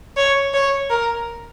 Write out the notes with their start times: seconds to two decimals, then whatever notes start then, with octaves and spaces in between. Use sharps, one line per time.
0.17 C#5
0.54 C#5
0.90 A#4